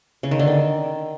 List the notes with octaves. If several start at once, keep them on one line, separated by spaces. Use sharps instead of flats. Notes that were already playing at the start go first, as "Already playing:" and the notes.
C#3
D#3
D3
D#3